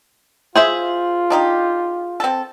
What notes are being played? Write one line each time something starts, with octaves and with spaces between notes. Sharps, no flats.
F4 G#4 C5 E5
D4 D#4 G4
C4 A4